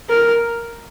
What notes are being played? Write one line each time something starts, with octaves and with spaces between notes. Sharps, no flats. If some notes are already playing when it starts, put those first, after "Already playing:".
A#4